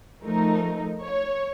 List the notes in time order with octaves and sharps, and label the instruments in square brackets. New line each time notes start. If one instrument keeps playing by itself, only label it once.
[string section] F3 A3 D#4 A#4
C#5